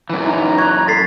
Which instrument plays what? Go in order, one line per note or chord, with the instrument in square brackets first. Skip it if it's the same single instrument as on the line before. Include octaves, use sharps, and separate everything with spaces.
[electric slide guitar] F#2 E3
[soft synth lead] D#4 [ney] A#5
[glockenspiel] C#6 G#6 [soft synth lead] F#6
[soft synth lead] A4 [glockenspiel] A6 B6 C7